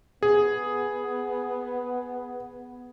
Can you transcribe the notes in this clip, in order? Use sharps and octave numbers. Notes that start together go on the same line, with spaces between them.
B3 G#4